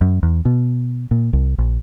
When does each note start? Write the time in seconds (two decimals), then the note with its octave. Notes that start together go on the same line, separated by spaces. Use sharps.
0.01 F#2
0.23 E2
0.45 B2
1.11 A#2
1.33 C2
1.58 A#1